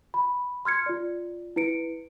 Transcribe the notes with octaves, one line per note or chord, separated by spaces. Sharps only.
B5
C6 F6 G#6 C#7
F4 D5
E4 B4 C#7 D7